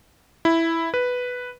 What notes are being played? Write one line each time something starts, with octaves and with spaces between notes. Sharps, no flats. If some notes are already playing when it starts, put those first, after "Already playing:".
E4
B4